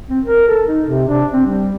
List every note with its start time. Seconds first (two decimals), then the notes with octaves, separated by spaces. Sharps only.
0.10 C4
0.26 A#4
0.48 A4
0.68 D#4
0.86 C3
1.09 D4
1.33 C4
1.46 G3